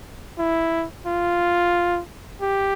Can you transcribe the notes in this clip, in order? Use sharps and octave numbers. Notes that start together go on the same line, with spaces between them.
E4
F4
G4